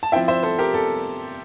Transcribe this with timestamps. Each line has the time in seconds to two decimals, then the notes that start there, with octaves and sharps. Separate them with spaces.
0.03 A5
0.12 F3 C4 E4 E5 G5
0.28 C5 E5
0.43 A4 C5
0.59 G4 A#4
0.74 A4